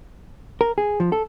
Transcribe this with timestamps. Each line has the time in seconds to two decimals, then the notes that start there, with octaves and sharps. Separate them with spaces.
0.61 A#4
0.78 G#4
1.00 F3
1.12 A4